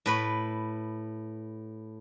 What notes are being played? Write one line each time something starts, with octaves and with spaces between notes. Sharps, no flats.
A2 B4 B5